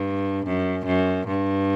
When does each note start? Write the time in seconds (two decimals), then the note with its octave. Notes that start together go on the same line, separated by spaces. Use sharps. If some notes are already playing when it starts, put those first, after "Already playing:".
Already playing: G2
0.46 F#2
0.86 F#2
1.28 G2